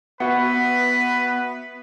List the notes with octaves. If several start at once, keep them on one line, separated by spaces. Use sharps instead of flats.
B3 F#4 B4 E5 F#5